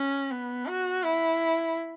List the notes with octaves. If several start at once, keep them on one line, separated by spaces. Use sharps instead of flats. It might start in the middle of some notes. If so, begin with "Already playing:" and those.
Already playing: C#4
B3
F#4
E4